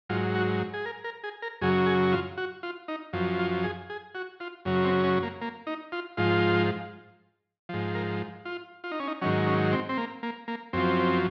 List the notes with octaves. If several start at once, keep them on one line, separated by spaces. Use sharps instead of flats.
G#2 F#3 F4
F#4
G#4
A#4
A#4
G#4
A#4
F#2 C#3 F#3 G#4
G#4
F4
F#4
F4
D#4
F#2 F3
F4
G#4
G#4
F#4
F4
F#2 C#3 F#3
C4
C#4
A#3
A#3
D#4
F4
G#2 F3 F4
G#2 F3
A#4
F4
F4
D#4
C#4
D#4
G#2 D#3 F#3 C#4
C#4
C4
C4
A#3
A#3
A#3
F#2 F3 C4